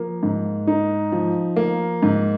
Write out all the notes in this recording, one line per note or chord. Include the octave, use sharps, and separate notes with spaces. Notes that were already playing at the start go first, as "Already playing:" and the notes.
Already playing: F3 A#3
G#2
D#4
F3
A#3
G#2